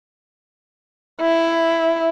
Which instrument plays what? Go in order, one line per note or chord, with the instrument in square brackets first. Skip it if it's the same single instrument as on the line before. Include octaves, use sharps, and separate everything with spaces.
[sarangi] E4